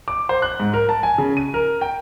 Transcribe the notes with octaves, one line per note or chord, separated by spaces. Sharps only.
D6
C5
F#6
G#2
A#4
A5
G#5
C#3
D#7
A#4
G5